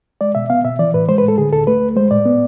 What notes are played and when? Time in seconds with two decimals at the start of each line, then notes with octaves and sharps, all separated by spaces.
0.21 G#3 D5
0.35 B2 E5
0.50 B3 F5
0.65 B2 E5
0.79 E3 D5
0.94 A2 B4
1.08 G#3 C5
1.18 B4
1.23 A2
1.28 A4
1.38 D3 G#4
1.53 D2 A4
1.67 A3 B4
1.82 D2
1.96 G#3 C5
2.11 A2 D5
2.25 B3